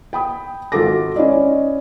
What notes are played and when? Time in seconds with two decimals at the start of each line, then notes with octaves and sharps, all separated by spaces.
0.13 G5 B5 D#6
0.72 G#1 F4 F#4 A4 D6 A#6
1.16 C#4 E4 D5 D#5